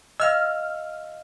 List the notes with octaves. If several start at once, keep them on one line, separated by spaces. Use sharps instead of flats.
D#5 F5 E6 F6